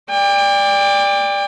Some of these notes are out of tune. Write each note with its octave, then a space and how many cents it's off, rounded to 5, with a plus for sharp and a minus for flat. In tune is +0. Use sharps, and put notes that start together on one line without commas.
D5 +0 G5 +35